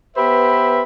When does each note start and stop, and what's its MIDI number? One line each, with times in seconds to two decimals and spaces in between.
0.16 0.81 59
0.16 0.81 67
0.16 0.81 71
0.16 0.81 72
0.16 0.81 76